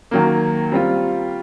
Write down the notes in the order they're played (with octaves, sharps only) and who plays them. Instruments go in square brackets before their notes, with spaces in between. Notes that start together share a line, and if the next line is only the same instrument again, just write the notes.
[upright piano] D#3 F#3 A#3
G3 C4 F4